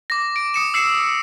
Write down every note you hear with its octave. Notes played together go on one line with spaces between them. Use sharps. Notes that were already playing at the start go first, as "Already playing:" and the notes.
D6 A#6
D7
D#6 C#7 E7
E6 C7 C#7 E7